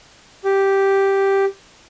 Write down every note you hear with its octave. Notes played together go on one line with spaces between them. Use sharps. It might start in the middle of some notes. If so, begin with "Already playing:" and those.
G4